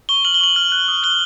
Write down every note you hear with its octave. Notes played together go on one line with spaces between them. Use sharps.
C#6 G7
F6 F#7
G7
C#6 F#7
F6
F#6
D#6
F#6 G7